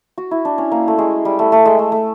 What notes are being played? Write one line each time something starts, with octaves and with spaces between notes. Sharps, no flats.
F#4
E4
D4
C#4
A#3
A3
G#3
G3
A3
A3
G#3
A3
A3